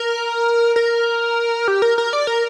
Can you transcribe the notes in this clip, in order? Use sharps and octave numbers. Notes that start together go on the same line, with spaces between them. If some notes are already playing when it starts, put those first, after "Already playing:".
Already playing: A#4
A#4
G4
A#4
A#4
D5
A#4